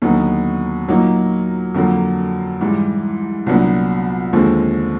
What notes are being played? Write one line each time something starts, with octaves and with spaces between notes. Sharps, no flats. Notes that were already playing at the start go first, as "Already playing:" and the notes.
D#2 D3 F#3 B3 D#4
A#2 F#3 A#3 D#4
F2 D3 F#3 A#3
G#2 E3 G3
C2 A#2 F#3 B3 D4
D#2 D3 F3 G#3 C4